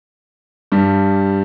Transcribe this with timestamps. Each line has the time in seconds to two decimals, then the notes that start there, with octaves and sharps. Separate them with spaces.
0.72 G2 G3